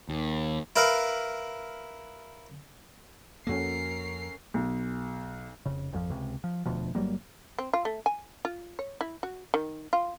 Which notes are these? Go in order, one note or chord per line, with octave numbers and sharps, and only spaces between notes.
D#2
E4 A#4 B4 F5
F2 A#3 C#4 F#4 A4 A#4 C7
B1
F1 C#3
G#1 F2 F3
C#2 C3
F3
E1 D2 B2 F3
G1 F#3 G3 A#3
C4
F4
A3
G#5
F4
C#5
E4
F#4
D#3
F4